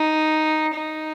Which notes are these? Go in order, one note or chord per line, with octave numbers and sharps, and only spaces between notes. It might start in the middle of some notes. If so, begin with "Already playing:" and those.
Already playing: D#4
D#4